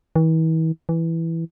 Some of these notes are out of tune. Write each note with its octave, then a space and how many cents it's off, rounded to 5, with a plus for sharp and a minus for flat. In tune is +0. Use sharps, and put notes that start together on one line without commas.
E3 -40
E3 +0